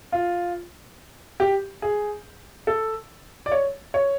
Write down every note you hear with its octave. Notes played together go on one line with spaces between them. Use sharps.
F4
G4
G#4
A4
D5
C#5
C#5